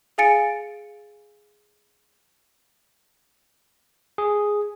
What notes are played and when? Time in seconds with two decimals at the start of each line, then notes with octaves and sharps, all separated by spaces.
0.18 G#4 F5 G#5 A6 C#7 D7
4.18 G#4